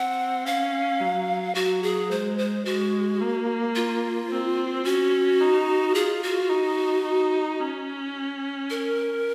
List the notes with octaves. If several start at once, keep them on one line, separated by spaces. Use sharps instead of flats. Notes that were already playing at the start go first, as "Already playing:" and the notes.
Already playing: C4 F#5
C#4 F5
F#3
F#3 F#4
G#4
G#3 C5
C5
G#3 F#4
A#3
F4
C4
C#4 F#4
D#4
F4 G#4
F#4
D#4
D#4
C#4
A#4